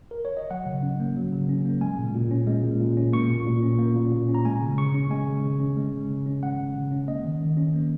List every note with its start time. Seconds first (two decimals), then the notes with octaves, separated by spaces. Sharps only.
0.11 A#4
0.25 C#5
0.37 D#5
0.51 F#3 F#5
0.66 C#3
0.83 C#4
1.00 A#3
1.16 F#3
1.33 C#3
1.49 C#4
1.65 A#3
1.81 G#3 G#5
1.99 A#2
2.15 A#2
2.31 C#4
2.47 G#3
2.64 A#2
2.81 A#2
2.97 C#4
3.13 A#3 C#6
3.30 A#2
3.46 A#2
3.63 C#4
3.79 A#3
3.96 A#2
4.13 A#2
4.28 C#4
4.35 A#5
4.45 G#3 G#5
4.62 C#3
4.77 C#3 C#6
4.94 C#4
5.10 G#3 G#5
5.27 C#3
5.43 C#3
5.60 C#4
5.77 G#3
5.93 C#3
6.09 C#3
6.26 C#4
6.43 G#3 F#5
6.59 C#3
6.76 C#3
6.92 C#4
7.08 A#3 D#5
7.25 D#3
7.41 D#3
7.57 C#4
7.74 A#3